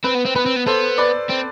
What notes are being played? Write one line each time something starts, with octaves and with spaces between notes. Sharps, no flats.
C4 B4
B3
C4
B3 B4
C4
B3
B3 A4 C5
B4 D5
C4